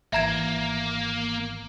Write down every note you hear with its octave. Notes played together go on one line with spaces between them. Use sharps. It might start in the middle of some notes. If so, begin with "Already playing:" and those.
G#1 E3 A#3 E5 A#5 G#6